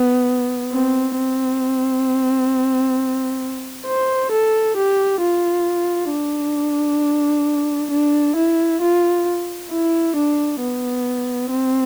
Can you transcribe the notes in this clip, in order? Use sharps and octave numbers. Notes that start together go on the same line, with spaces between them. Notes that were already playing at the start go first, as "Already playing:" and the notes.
Already playing: B3
C4
C4
C5
A4
G4
F4
D4
D4
E4
F4
E4
D4
B3
C4